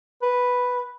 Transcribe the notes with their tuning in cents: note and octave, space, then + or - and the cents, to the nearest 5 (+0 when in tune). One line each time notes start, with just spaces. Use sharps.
B4 +0